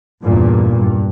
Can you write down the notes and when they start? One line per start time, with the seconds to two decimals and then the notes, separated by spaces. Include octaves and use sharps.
0.24 E2 G2 A#2
0.78 G2